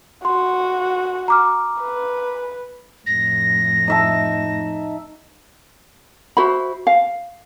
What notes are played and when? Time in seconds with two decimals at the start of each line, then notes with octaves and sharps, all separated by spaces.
0.25 F#4 C6
1.28 A#5 D6 F6
1.82 B4
3.07 F2 A2 A#6
3.88 D#4 E5 A5
6.37 F#4 C5 E5 B5
6.87 F5